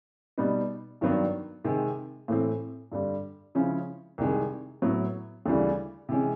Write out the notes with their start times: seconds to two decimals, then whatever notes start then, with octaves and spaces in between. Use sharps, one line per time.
0.38 B2 G3 B3 D#4
1.01 G2 D#3 F#3 B3 D4
1.64 C3 D#3 G#3 C4
2.28 A2 E3 A3 C4
2.92 G2 D3 G3
3.55 C#3 F3 G#3 C#4 E4
4.18 C2 C3 D#3 G#3
4.82 A2 F#3 B3 E4
5.46 D2 C#3 E3 G3
6.09 C3 E3 G#3 C#4